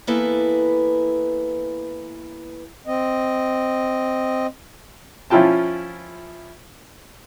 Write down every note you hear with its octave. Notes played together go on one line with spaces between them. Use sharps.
E3 A#3 B3 E4 A4 B4
C4 D#5
F3 C#4 E4 F4 G5 A5